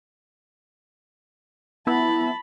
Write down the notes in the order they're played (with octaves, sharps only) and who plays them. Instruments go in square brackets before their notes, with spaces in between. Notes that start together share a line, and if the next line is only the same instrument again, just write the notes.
[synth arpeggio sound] B3 E4 [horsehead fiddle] A5 B5